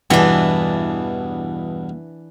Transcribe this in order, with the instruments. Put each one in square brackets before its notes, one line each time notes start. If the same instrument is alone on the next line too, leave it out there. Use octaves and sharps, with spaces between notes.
[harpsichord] E2 G2 B2 [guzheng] E3 D4